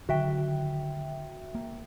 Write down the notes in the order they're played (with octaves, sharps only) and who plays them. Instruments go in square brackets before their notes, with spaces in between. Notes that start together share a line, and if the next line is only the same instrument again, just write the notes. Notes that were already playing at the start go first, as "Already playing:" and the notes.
[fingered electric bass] D3 D#3 F#3 [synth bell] F#4 E5 G5
[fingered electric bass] A#3